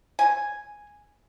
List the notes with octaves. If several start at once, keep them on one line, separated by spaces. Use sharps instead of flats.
G#5